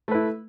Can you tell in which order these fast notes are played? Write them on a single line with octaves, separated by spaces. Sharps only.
A3 B4 E4